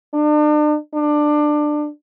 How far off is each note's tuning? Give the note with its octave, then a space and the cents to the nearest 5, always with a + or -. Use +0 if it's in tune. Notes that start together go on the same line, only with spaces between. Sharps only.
D4 +40
D4 +20